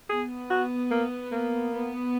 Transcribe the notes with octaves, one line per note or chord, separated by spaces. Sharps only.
B3 G#4
F#4
A#3
A#3
B3